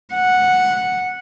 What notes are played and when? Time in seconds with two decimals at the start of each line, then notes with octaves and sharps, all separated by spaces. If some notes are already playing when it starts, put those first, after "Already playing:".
0.14 F#5